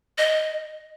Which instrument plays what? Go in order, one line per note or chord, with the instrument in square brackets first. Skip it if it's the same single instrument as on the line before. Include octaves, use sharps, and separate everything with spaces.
[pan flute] D#5